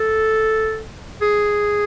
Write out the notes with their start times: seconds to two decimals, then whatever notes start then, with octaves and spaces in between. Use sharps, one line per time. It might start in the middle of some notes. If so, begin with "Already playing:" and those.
Already playing: A4
1.22 G#4